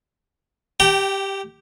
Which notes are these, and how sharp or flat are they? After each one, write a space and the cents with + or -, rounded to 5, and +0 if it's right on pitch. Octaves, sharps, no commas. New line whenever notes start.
G4 +0 G5 -25 A#5 -40